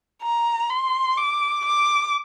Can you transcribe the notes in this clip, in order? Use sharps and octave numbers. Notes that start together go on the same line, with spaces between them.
A#5
C6
D6
D6